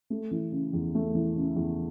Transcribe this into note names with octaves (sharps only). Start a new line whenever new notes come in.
A3
E3
C#3
E2
A3
E3
C#3
E2